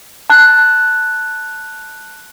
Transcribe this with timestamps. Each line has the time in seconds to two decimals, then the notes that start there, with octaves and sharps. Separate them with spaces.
0.30 A5 F#6